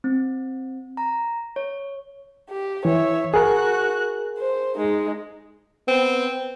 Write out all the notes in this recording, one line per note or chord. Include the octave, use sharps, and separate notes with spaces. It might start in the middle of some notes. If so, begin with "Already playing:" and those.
C4
A#5
C#5
G4
E3 C#5 E5
F#4 G#4 A#4 F#6
C5
G#3 D#4
B3 C4